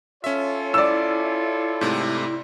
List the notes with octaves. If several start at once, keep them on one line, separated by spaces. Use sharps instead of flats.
C#4 F4 A4 C#5 E5
E4 D5 E6
G#2 C3 A3